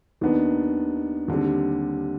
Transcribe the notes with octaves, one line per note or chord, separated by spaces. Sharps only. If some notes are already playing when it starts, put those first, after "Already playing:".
D#2 D#3 B3 D4
D#2 D3 G3 C4